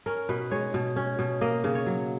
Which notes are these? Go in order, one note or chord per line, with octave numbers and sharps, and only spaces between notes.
C#4 A#4
B2 B4
G#3 C#5
B2
C#4
B2
A#3 D#5
C#3
C#5
F#3